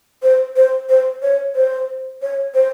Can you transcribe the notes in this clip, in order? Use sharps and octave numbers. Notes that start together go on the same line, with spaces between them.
C5
C5
C5
C#5
C5
C#5
C5